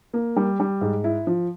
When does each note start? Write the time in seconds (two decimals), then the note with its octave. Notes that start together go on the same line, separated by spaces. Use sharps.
0.14 A#3
0.36 G3
0.60 G3
0.81 G#2
1.04 E4
1.27 F3